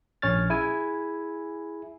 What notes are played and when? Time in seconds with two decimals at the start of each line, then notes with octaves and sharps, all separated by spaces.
0.22 A#1 C#4 C#5 F6 A6
0.50 E4 G#4 G#5